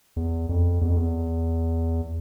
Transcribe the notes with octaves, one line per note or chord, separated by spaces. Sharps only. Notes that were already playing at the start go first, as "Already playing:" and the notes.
E2
F2
E2
F2
E2